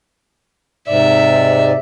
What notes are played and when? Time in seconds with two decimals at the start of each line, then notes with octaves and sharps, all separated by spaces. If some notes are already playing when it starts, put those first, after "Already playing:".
0.88 G#2 C3 D5 E5